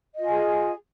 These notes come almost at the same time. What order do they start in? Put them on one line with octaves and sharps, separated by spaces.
D#5 F4 G#5 G#4